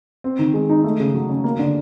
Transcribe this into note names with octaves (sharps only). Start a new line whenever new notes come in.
C4
D#3
G#3
D#4
A3
C#3
F#3
C#4
A#3
D3